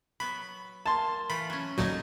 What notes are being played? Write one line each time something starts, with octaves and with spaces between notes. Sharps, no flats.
F#3 B3 B5
A#3 A5 C6
E3 A3 F4 B5
F#3 C#4
D2 A#2 F#3 D#4 G#5 A5